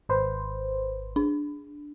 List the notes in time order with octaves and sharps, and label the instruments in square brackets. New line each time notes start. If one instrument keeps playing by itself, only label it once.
[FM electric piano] G#1 B4 C5
[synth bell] D4